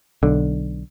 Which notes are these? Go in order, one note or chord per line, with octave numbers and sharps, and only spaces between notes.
B1 D3